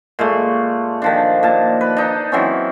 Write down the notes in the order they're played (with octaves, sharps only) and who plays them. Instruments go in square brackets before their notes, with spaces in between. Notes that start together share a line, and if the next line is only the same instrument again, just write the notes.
[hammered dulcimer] A#2 G#3 A3
D#3 F3 D4
A#2 A5
B4
D4 D#4
E3 F#3 C4 C#4